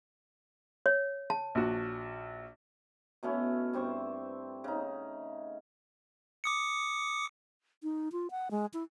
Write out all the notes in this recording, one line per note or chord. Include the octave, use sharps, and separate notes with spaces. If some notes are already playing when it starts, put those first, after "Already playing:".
C#5
A5
A#1 F#4
B2 A3 C#4 E4
G2 C4 C5 C#6
C#3 D#4
D6 D#6 C#7
D#4
F4
F#5
G#3
E4